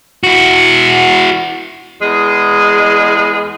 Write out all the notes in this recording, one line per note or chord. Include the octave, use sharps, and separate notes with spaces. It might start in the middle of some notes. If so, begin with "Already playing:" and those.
E4 F#4
E2 G#3 G#4